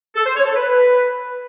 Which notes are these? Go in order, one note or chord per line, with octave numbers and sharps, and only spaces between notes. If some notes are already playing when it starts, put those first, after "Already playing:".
A4
C5
C#5
A4
B4